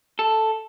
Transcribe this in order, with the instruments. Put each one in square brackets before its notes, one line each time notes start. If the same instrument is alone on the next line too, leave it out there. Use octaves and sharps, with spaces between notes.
[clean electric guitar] A4